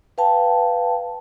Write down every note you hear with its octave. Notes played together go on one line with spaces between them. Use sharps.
B4 F5 G5 A5